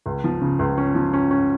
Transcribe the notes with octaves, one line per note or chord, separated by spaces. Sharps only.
C#2
F3
C#3
C#2
C#4
F3
C#4
C#4